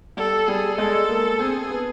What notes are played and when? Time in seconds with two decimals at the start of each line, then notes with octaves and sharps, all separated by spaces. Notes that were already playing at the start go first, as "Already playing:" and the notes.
0.17 G3 A4
0.48 G3 G#4
0.78 G#3 A4
1.09 A#3
1.39 C4 G#4
1.70 B3